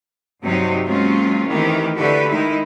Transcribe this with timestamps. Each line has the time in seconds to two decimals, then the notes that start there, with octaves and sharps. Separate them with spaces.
0.42 G2 C3 F#3 C4 D#4
0.86 F#3 G#3 A#3 C4 C#4 F4
1.47 D#3 E3 A3 C4 G4
1.98 D3 E4 F#4 G4 A4 B4
2.27 D#3 G#3 D#4 E4